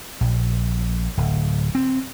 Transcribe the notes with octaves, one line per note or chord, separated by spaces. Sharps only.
A#1
D1
C4